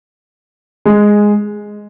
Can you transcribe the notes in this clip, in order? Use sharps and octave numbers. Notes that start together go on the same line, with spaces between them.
G#3